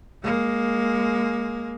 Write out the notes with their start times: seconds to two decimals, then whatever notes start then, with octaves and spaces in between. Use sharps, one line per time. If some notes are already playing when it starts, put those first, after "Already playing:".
0.23 G#3 A#3